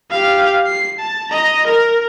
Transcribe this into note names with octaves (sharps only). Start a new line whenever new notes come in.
G4 F5
C7
A5
D#5 A#5
A#4